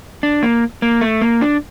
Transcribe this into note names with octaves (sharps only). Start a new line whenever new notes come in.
D4
A#3
A#3
A3
A#3
D4